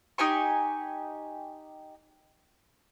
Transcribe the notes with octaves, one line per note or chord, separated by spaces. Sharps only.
D#4 G4 G#5 C#6